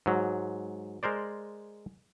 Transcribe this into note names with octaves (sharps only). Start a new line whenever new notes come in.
G#2 F#3
G#3 A#4 C5 D5